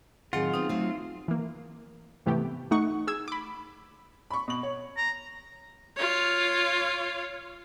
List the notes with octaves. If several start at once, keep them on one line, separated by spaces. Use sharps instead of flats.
A2 D#3 F#3 C4 F4 G#4 F#5
B3 C4 D#4
F#3 A3 C4
E3 A#3
G#2 C3 E3 A3 B3 G4
A3 D#4 F#5 C#6
G#4 E6 G#6
B5 D6
B5 C#6
B2 F#7
C#5
A#5
F4 C#5